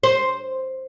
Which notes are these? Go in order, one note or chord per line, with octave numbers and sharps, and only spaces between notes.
C5